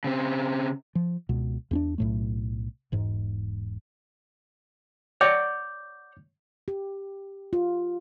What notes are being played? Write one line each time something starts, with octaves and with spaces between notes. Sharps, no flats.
C#3 C4
F3
C#2 B2
E2 C#4 D4
B1 A2 A3
E1 G#2
C#5 D5 F#5 D6 G6
G4
F4